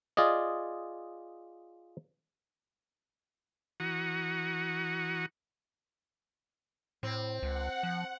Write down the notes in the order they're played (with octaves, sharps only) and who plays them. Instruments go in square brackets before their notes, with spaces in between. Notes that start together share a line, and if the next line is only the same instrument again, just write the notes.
[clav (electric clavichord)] F4 G#4 D5 D#5
[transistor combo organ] E3 F#4 F#5 A#5 C#6 D#6
[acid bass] A2 [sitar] C4
[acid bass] C#2 [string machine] F#5
[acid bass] F3